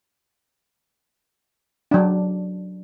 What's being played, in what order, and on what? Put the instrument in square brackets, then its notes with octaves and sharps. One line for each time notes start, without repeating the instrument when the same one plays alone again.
[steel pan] F#3 D4